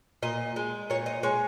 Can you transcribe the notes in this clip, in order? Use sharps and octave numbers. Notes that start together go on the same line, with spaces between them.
A#2 D#5
G#3
A#2 C#5
D#5
G#3 C#5